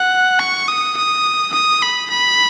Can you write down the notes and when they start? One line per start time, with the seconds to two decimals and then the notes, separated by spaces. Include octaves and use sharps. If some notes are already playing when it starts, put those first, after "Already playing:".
Already playing: F#5
0.39 C#6
0.68 D#6
0.97 D#6
1.53 D#6
1.82 B5
2.10 B5